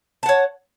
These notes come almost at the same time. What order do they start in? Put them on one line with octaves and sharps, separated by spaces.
A5 F#5 C#5